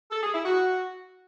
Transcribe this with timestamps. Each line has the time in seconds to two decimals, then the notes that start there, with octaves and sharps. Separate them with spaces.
0.12 A4
0.23 G#4
0.34 E4
0.45 F#4